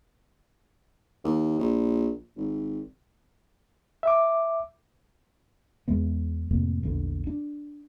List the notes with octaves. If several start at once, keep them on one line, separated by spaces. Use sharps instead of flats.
D#2
A#1
G#1
E5 D6
E2 G#3 B3
F2 A2 C3 A#3
A#1 E2 D3
D4